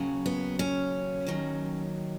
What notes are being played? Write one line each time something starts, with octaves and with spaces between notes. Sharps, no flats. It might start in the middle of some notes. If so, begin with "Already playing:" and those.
Already playing: D#2 C#3 F#3
B3
C#4
D#2 D#3 F#3